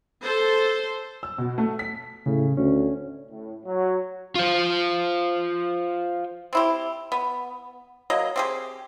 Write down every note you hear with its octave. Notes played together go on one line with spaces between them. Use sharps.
A4 C5
E6
B2
A3
B6
A2 C#3
D2 C#4
A2
F#3
F4 C5
C4 E4 G4
B3
F#3 A#3 D#5
C4 G4 G#4